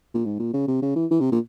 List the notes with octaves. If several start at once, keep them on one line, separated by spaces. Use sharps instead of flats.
A#2
G#2
A#2
C#3
C3
C#3
E3
E3
C3
A#2